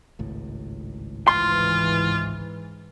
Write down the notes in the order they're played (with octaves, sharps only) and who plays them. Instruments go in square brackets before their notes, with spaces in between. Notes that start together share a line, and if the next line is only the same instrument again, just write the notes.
[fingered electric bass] G#1 C#2 A2
[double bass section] G#2 E3 [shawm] F4 [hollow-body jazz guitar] C6